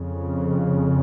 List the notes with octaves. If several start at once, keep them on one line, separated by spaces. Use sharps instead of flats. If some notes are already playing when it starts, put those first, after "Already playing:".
Already playing: F2 C#3